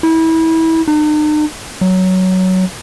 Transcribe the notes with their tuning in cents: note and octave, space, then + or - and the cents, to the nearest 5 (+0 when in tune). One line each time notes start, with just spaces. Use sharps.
E4 -25
D#4 -45
F#3 +10